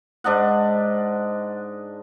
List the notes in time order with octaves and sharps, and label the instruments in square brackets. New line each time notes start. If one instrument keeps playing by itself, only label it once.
[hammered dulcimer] G#2 D4 D#5 F#5